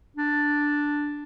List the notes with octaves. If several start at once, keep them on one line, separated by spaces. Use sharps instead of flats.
D4